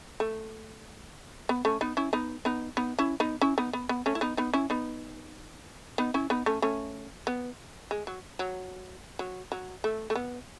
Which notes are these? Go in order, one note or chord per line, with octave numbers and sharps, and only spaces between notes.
A3
B3
A3 C#4
B3 D#4
C#4 E4
B3 D#4
B3 D#4
B3 D#4
C#4 E4
B3 D#4
C#4 E4
B3 D#4
B3
B3
A3 C#4
E4
B3 D#4
B3 D#4
C#4 E4
B3 D#4
B3 D#4
C#4 E4
B3 D#4
A3 C#4
A3 C#4
B3
G#3
F#3
F#3
F#3
F#3
A3
A3
B3